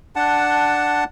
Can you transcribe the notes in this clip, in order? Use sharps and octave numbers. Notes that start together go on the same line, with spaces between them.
D4 F#5 A5